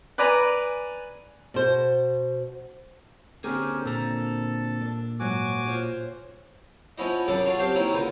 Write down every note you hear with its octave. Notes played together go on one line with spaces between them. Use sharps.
B4 D5 G#5 A#5 B5
B2 C5
D3 A#3 C4 C#4 G4 G#4 A#4
A#2 A4 A5 A#5
D4
G#2 F#3 F#4 G#5 D6
F4 C5 C#5
F3 B3 C#4 E4 D#5
F#2 C#3 D4 A4 F#5 D#6
D4 F4 F#4 C#5
F#3 C4 G4 F5
D#3 A#3 C4 C#4 D#4 E4
C#2 A#2 B3